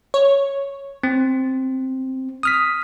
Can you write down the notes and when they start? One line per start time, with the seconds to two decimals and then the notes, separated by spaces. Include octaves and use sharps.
0.14 C#5
1.03 C4
2.43 D#6 F6 B6